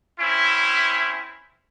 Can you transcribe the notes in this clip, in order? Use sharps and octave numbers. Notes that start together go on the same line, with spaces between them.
C4 C#4 E4